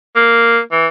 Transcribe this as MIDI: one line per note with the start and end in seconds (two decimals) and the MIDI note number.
0.15 0.60 58
0.72 0.87 52